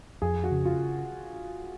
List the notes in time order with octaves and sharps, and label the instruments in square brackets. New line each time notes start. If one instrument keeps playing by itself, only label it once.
[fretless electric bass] F2 [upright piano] G#4
[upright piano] F#4
[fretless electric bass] C#3
[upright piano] F4